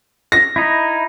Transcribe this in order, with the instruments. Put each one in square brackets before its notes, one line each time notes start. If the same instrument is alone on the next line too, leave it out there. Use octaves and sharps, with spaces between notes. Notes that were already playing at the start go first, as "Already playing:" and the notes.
[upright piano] A#6
[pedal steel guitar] D#4 E4